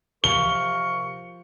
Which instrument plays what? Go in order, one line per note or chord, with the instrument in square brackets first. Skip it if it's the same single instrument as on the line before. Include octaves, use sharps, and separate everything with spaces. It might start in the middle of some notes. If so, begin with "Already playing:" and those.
[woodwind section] C3 A#4 C#6 [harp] F3 [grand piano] G7